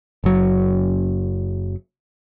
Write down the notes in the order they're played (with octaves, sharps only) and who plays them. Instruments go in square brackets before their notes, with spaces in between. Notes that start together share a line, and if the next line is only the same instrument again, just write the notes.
[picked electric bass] F#1 F#3